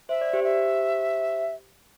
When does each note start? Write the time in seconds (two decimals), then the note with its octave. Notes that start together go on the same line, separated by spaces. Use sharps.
0.09 C5 E5
0.21 D5
0.33 G4 C5
0.44 E5